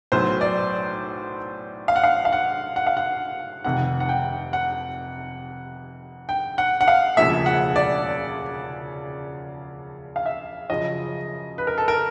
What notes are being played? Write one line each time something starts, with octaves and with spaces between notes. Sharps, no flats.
B1 A2 F#3 B3 C5
D5
F5
F#5
F5
F5
F#5
F#5
F5
F#5
F1 F2 C3 D#3 F#5
F#5
G5
F#5
G5
F#5
F#5
F5
E1 D2 C#3 F3 A#3 E5
F#5
D5
F5
E5
F#2 C#3 F3 D#5
B4
A#4
A4
A#4